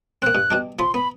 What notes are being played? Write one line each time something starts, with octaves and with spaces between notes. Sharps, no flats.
A#3 C4 F#6
G2
B2 G3 D4
F3 B5 C6 D#6
B3 B5